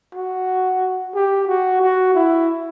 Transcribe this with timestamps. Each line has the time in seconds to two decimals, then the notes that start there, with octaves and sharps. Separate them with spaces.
0.15 F#4
1.15 G4
1.48 F#4
1.82 F#4
2.15 E4